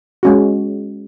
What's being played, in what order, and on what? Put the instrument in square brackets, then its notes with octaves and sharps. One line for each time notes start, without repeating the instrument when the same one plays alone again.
[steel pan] G#3 C#4 F#4